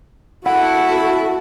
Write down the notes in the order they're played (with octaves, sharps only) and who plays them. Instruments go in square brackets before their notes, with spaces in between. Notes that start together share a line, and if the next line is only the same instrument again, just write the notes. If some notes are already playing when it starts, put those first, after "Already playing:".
[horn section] E4 [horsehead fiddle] F#4 A4 [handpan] F#5